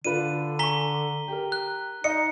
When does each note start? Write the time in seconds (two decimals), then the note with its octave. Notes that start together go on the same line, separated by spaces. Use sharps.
0.04 D3 D4 F4 B4 D#7
0.59 G#5 A#5 C#6 B6 G7
1.28 G4 A#4
1.52 F#6
2.04 D#4 D#5 C#7